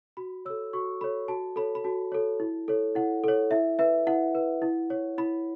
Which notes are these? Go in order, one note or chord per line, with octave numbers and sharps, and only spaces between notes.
F#4 B5
A4 C#5 E6
F#4 C#6
A4 C#5 B5
F#4 A5
A4 C#5 B5
B5
F#4 A5
A4 C#5
E4
A4 C#5
E4 F#5
A4 C#5
E4 E5
B4 E5
E4 F#5
B4
E4
C#5
E4 B5